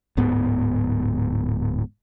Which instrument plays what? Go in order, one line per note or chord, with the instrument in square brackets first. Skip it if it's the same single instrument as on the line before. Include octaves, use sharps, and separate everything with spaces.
[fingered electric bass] D1 G#2 B3